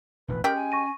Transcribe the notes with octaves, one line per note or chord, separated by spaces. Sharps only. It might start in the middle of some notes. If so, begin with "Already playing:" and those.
E1 A1 A2 B4
G#3 C#4 G4 A#4 G5
G#5
C#6 A#6 D#7